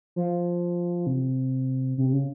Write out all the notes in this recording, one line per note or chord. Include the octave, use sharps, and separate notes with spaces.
F3
C3
C3
C#3